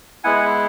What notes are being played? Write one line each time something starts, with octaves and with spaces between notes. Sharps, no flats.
G#3 B3 E4 F#5 G#5